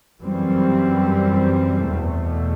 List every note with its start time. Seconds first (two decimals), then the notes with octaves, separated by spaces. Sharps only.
0.22 F#2 E3 G3 C4
1.87 E2 B2 A3